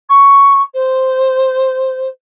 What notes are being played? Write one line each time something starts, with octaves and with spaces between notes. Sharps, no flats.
C#6
C5